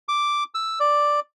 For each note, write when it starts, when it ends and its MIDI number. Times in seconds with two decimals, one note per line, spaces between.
0.09 0.44 86
0.55 0.79 88
0.80 1.20 74